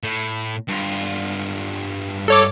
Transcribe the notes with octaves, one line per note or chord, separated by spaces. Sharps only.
A2
G2 F4
A4 C#5 D6